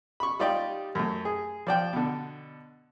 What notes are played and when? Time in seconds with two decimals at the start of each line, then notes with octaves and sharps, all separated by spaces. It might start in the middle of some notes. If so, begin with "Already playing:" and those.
0.20 B5 C#6
0.39 G3 D#4 F4 G4 D5 G5
0.95 F#2 A3
1.25 G#4
1.67 F3 D5 G5
1.93 B2 D3